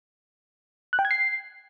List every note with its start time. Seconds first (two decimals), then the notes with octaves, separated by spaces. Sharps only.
0.93 F#6
0.99 G5
1.05 G#6
1.11 C7